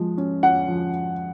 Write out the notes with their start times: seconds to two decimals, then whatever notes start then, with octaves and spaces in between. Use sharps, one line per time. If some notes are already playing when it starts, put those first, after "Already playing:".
Already playing: F3 G#3
0.18 C#4
0.43 C#4 F#5
0.68 F3